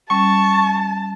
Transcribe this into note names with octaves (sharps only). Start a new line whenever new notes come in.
G3 C#4 A5 C#6